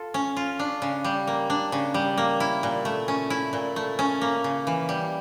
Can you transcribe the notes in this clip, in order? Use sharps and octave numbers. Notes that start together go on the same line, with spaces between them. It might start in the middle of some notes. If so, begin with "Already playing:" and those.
Already playing: F4 A4
C#4
F4
D4
C#3
G3
A#3
D4
C#3
G3
A#3
E4
A#2
A3
C#4
E4
A#2
A3
C#4
A#3
C#3
E3
G3